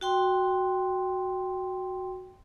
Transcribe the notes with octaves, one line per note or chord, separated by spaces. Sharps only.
F#4 G5 C6